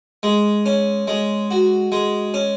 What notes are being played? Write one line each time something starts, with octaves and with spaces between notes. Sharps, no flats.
G#3
C#4
G#3
F#4
G#3
C#4